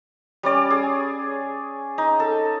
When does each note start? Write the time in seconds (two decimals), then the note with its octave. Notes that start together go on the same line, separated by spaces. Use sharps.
0.43 G3 C#4 D5
0.70 G#4
1.98 D#4
2.20 A4